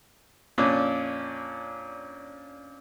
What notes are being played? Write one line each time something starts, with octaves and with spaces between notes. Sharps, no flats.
F2 A#2 C#4 D4